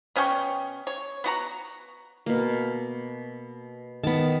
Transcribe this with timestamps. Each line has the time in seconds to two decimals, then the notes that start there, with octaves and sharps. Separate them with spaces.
0.16 B2 C#4 G5 C#6
0.87 C#5
1.24 B3 F#4 A#5
2.26 B2 A#3
4.03 D#3 B3 A5 B5